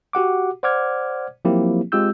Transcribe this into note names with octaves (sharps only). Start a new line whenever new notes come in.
F#4 G4 F#5 D6
C5 D5 F#5 D6 F6 G#6
F3 F#3 A#3 C4 E4 G4
G#3 C4 F4 G4 E6 G6